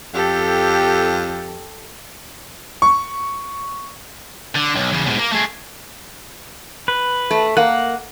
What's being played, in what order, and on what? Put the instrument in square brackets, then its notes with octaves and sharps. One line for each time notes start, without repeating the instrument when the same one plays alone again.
[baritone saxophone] F2 [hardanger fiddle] G4 A4
[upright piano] C#6
[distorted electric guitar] D3
B1
E2 C#3
G#2 B2
A#3
A3 G#4
[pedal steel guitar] B4
[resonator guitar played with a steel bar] A3
[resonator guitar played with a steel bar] A#3 [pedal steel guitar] F#5